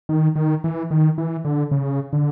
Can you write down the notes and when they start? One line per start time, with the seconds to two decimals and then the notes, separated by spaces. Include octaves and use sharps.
0.09 D#3
0.36 D#3
0.64 E3
0.91 D#3
1.18 E3
1.45 D3
1.71 C#3
2.13 D3